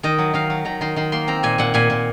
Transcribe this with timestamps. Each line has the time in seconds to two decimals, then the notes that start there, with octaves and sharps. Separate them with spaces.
0.03 D#3 D#5
0.18 F#3
0.34 D#3 F5
0.50 F#3
0.65 D#3 A#5
0.81 D#3 C6
0.96 D#3 C6
1.12 A#3 C6
1.28 C4 A#5
1.43 A#2 G#5
1.58 A#2 F#5
1.74 A#2 G#5
1.90 A#2